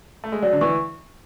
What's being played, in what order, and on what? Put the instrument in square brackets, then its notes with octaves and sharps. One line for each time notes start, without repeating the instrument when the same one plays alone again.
[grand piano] A3
G#3
[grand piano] F#3 [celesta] D5
[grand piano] D3
[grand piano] E3 [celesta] C#6